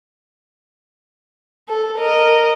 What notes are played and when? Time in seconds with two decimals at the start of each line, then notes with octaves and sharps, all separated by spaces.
1.68 A4
1.98 A#4 D#5